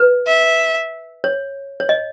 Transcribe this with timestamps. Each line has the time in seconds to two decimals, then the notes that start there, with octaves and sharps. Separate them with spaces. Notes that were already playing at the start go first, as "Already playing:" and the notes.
Already playing: B4
0.27 E5
1.24 C#5
1.80 C#5
1.89 D#5